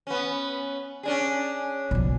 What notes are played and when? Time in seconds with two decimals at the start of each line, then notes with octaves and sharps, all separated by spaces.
0.07 B3 C#4
1.03 C#4 D4 G#4
1.91 B1 F3